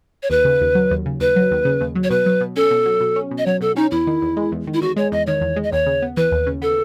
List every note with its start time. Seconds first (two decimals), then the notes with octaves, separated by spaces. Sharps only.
0.23 C#5
0.30 D#2 B4
0.45 C#3
0.61 D#2
0.75 F#3
0.91 D#2
1.06 C#3
1.20 D#2 B4
1.36 F#3
1.51 D#2
1.65 C#3
1.81 D#2
1.95 F#3
2.04 C#5
2.10 B2 B4
2.26 F#3
2.41 B2
2.56 C#4 A4
2.71 B2
2.86 F#3
3.00 B2
3.16 C#4
3.31 B2
3.38 D#5
3.46 F#3 C#5
3.61 B2 A4
3.76 C#4 D#4
3.91 E2 E4
4.07 D#3
4.22 E2
4.37 G#3
4.52 E2
4.67 D#3
4.74 E4
4.82 E2 F#4
4.96 G#3 C#5
5.12 E2 D#5
5.27 D#3 C#5
5.41 E2
5.56 G#3
5.64 D#5
5.72 D#2 C#5
5.86 C#3
6.02 B3
6.17 E3 B4
6.32 D#2
6.47 C#3
6.62 B3 A4